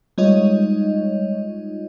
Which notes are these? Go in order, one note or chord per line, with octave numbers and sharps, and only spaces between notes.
G3 G#3 D#4 F4 C#5 D#5